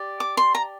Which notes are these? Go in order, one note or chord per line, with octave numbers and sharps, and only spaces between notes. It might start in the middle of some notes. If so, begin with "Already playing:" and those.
Already playing: G4 D5
D6
C6
A#5